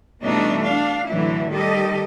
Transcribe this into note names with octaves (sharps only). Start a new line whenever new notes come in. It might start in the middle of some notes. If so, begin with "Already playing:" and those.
B2 E3 G3 A3 D4 D#4
D4 F5
A2 D3 E3 F#3 D4 E4
D#3 G3 G4 A4 D#5